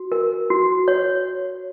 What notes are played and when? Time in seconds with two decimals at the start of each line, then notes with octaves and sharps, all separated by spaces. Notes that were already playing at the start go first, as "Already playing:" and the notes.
Already playing: F#4
0.12 A#4
0.50 F#4
0.88 C#5